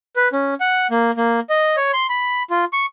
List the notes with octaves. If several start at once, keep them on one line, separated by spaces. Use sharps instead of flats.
B4
C#4
F#5
A#3
A#3
D#5
C#5
C6
B5
F4
C#6